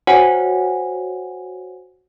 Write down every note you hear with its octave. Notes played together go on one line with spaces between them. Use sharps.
F#4 C5 C#5 F#5 G#5